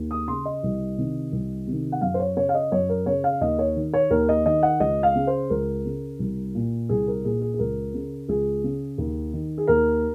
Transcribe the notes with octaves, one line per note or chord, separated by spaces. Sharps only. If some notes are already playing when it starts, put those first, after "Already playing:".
Already playing: D#2
D#6
C#3 C6
D#5
C2
C3 D#3
C2
C3 D#3
F#5
F#2 F5
C5
C#5
C#3 C#5
F5
D#5
F#2 C#5
A#4
C#3 C#5
F5
D#2 D#5
C#5
D#3
C#5
D#2 A#4
D#5
D#3 D#5
F#5
C#2 D#5
F5
C#3
C5
C#2 A#4
C#3
C2
A#2
C2 G#4
A#4
A#2 G#4
G#4
G#4
C#2 A#4
C#3
C#2 G#4
C#3
D#2
D#3
G#4
D#2 A#4